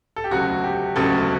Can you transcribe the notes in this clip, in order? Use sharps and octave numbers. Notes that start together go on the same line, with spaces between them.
A4
G4
E1 D2 C#3 F#3 F#4
G4
E1 D2 C#3 F#3 A4